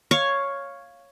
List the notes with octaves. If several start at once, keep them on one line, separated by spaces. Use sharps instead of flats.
C#5 F5 C#6